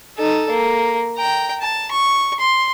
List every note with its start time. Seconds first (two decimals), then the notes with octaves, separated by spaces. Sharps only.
0.17 D#4 A4
0.50 A#3
1.17 G5 A#5
1.61 A5
1.92 C#6
2.40 C6